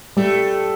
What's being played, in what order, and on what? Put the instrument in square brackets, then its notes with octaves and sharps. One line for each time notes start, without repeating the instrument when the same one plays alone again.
[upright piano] G3 [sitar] A3